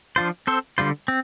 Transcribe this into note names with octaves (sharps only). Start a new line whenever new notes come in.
F3 D4 F4 C5
C4 A4 C5
D3 G3 F4 C5
C4